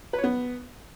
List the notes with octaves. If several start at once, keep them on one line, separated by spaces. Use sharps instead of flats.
B4
C#5
B3